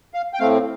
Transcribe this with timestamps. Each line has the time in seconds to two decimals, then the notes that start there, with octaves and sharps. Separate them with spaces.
0.14 F5
0.33 G5
0.39 A2 A3 C4 F5